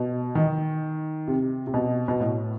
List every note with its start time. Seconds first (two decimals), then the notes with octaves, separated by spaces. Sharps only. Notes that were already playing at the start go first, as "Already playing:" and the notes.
Already playing: B2
0.35 D#3
1.28 C3
1.67 C3
1.74 B2
2.08 B2
2.20 A2